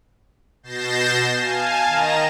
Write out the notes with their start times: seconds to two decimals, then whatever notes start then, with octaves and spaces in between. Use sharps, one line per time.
0.63 B2 G6 A6 A#6 C7 E7
1.33 F5 G#5 A5
1.87 D#3 D#5 A#5 E7